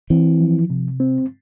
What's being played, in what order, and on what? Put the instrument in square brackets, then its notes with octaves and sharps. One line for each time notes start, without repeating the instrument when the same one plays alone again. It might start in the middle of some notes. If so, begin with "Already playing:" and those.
[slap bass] E3 [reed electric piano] C4
[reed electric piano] F3
C3
C4